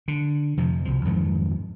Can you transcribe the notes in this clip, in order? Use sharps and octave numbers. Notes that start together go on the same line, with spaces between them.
D3
F2 C3 F3
C2 F3
F2 G#2 D#3 F#3